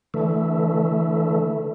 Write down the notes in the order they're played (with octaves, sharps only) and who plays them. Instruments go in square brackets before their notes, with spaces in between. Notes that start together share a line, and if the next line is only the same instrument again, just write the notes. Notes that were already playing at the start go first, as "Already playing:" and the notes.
[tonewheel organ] D3 E3 A3